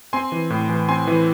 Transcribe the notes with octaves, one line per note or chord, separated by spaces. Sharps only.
C4 G#5 C6
E3
A2
E3
C4 G#5 C6
E3